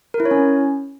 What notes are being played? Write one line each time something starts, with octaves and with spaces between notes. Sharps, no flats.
A#4
E4
C#5
C#4